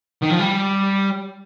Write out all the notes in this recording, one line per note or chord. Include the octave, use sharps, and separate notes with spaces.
D#3
F3
G3